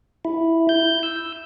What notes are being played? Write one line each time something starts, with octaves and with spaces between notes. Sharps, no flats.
E4
G6
E6